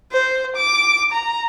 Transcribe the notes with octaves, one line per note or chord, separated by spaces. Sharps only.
C5
D6
A#5